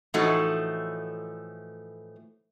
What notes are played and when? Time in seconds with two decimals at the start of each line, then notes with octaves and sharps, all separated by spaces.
0.14 A2 E3 F3 A3 D#4 F#4